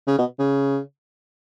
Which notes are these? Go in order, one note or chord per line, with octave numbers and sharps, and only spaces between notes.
C#3
B2
C#3